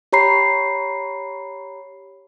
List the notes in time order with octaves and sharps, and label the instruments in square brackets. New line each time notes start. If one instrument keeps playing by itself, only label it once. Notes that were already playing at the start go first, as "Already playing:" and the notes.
[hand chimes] G4 C#5 A#5 B5 C7